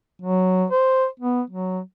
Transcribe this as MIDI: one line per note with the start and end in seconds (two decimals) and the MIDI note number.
0.21 0.65 54
0.70 1.06 72
1.19 1.41 59
1.50 1.80 54